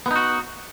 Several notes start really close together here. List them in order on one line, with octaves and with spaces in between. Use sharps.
B3 D#4 F#4